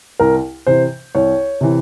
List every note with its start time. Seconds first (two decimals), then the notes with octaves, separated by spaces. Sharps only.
0.19 C2 A#4
0.67 C3 E3 C5
1.15 C2 C#5
1.61 C3 E3